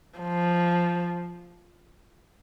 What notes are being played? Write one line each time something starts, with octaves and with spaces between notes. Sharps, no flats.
F3